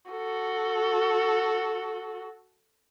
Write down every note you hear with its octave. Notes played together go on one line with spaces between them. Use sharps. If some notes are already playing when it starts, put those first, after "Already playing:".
F#4 A4